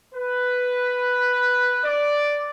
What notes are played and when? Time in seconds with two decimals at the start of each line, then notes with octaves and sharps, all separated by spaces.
0.13 B4
1.84 D5